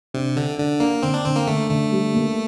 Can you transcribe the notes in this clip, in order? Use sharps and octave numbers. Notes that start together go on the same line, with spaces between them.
C3 D4
D3 D4
D3 D4
A#3 D4
D3 C4
D4
D3 C4
A#3
D3 A3
D3 A3
G3
A#3